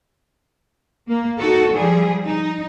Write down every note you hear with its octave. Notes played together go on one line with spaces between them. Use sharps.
A#3
D#4 F#4 A4
F3 G3 G#4
D#4